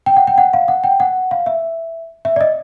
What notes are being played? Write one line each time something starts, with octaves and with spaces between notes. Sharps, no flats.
G5
F#5
G5
F#5
F5
F#5
G5
F#5
F5
E5
E5
D5
D#5